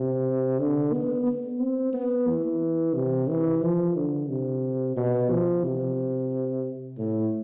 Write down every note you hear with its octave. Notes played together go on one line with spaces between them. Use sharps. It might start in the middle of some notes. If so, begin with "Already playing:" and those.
Already playing: C3
D3
B3
B3
C4
B3
E3
C3
E3
F3
D3
C3
B2
F3
C3
A2